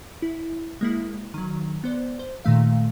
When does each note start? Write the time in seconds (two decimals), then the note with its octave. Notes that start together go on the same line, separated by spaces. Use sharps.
0.22 E4
0.81 G#3 A#3 E4
1.34 D#3 F#3
1.84 B3 C5 D5
2.19 C5
2.45 A#2 D#3 A3 F5